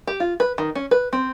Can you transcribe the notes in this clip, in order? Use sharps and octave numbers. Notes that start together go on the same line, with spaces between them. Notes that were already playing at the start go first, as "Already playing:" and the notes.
G4
F4
B4
D#3
C#4
B4
C4